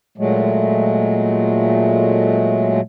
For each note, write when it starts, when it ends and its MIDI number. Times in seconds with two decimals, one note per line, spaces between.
0.18 2.81 46
0.18 2.81 54
0.18 2.81 56
0.18 2.81 57